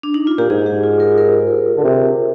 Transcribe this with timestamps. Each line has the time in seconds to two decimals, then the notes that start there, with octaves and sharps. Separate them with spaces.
0.03 D4
0.14 D#4
0.27 F4
0.38 A#2 G4
0.50 G#2 G#4
0.66 G4
0.84 F4
1.00 A#4
1.18 A#4
1.77 D3
1.84 C3